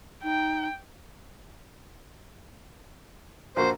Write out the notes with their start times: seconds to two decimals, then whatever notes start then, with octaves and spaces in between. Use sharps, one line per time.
0.23 D#4 G5
3.56 A#1 A#3 F#4 C5